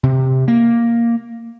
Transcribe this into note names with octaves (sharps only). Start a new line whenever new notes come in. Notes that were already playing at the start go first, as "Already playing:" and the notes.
C3
A#3